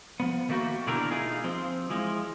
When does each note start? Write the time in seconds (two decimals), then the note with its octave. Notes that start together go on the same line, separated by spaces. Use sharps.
0.20 F3 B3
0.49 D#3 A3 A#3 F#4 G4
0.87 B2 D3 E3 D4 G4 A#4
1.10 A3 D#4 F4 G#4
1.44 F3 C4
1.90 E3 F3 G#3